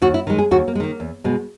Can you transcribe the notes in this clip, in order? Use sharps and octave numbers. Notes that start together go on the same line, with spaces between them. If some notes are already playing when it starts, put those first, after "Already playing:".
D#2 F#4
E4
D#3 G#3
G#4
D#2 F#4
A#3
G#3
D#3 A#3
E2
B2 G#3